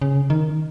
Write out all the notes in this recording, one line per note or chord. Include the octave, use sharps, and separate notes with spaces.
C#3
D#3